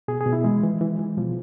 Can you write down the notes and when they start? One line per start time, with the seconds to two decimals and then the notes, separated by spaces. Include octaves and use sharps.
0.08 B2 G#4
0.21 G#4
0.26 B2
0.33 E4
0.44 E3 G#3
0.64 E3
0.81 E3
0.99 E3
1.17 B2 F3